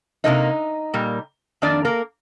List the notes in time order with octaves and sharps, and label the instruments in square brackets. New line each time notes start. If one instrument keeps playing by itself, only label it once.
[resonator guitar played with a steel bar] C3 G3 A#3 D#4 D#5
A#2 G3 A#3
F2 D#3 A#3 D4 D5
A#3 A#4